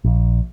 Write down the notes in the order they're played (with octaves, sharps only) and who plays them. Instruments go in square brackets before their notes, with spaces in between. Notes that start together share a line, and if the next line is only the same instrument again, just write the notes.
[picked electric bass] A#1